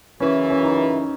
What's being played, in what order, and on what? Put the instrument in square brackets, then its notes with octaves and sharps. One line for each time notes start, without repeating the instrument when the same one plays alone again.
[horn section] F#2 C#3 E3 [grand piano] C#4
[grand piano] C#4
D#4